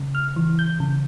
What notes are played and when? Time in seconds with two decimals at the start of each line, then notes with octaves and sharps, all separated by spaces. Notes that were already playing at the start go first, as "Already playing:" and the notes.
Already playing: C#3
0.15 F6
0.36 E3
0.59 G6
0.80 C#3